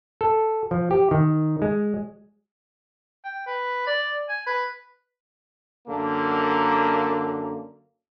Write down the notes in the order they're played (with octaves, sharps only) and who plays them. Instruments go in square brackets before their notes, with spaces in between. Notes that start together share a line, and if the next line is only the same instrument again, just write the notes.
[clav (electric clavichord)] A4
F3
G4
D#3
G#3
[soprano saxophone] G5
B4
D5
G#5
B4
[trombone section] F#2 D3 A#3